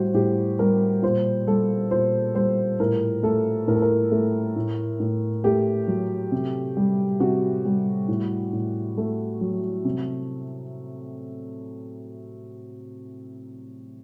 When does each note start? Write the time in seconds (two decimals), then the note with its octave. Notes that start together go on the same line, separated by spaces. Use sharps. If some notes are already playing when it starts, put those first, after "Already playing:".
Already playing: A2 G3 F#4 C5
0.14 A2 G4
0.59 G3 A#4
1.02 A#2 C5
1.47 G3 A4
1.91 A#2 C5
2.35 G3 C5
2.80 A2 A#4
3.23 A3 A4
3.68 A2 A#4
3.74 A4
3.82 A#4
4.12 A3
4.56 A2
5.00 A2
5.44 A3 G4
5.88 F#3
6.32 C3
6.77 G3
7.20 C3 F#4
7.65 G3
8.08 A2
8.53 A2
8.98 A3
9.41 F#3
9.85 C3